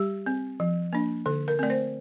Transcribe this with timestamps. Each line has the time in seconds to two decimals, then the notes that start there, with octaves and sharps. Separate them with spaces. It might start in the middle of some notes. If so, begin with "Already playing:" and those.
Already playing: G3 G4
0.26 C4
0.60 F3
0.93 A#3 D4
1.26 D3 A4
1.48 A#4
1.59 A3 C4 D5
1.70 C5